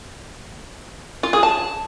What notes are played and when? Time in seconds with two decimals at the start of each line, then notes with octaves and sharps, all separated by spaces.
1.23 F4
1.33 G#4
1.43 A5